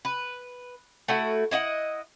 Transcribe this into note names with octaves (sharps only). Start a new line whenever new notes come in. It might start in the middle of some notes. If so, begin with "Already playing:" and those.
B4
A3 E4 F#4
E4 D#5 E5 F#5